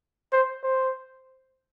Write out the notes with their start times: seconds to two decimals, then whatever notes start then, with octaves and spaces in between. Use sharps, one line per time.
0.33 C5
0.63 C5